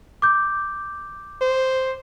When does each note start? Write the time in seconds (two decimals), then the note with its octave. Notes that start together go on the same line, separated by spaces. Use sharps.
0.22 D6 G6
1.42 C5